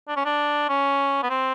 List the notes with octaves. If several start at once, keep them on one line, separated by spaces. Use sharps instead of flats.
D4
C#4
D4
C#4
B3
C4